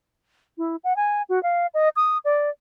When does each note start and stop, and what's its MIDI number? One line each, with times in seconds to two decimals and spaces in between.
0.58 0.76 64
0.84 0.96 78
0.96 1.22 80
1.29 1.41 66
1.43 1.67 77
1.74 1.89 75
1.96 2.18 87
2.25 2.50 74